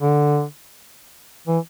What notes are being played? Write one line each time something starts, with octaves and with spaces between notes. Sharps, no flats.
D3
E3